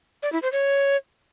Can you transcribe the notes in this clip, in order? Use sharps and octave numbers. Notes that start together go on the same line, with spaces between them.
D5
E4
C5
C#5